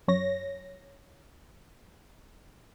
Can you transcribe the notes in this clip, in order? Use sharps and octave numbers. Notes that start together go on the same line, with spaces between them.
F#2 C#5 A#6